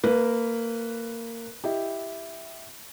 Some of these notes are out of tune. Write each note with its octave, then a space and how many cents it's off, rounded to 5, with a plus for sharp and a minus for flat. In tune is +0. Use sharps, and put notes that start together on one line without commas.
A#3 -20 B4 +0
E4 +0 G4 +0 D#5 +0